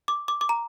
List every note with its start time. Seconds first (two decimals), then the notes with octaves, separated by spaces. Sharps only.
0.08 D6
0.28 D6
0.41 D6
0.49 A#5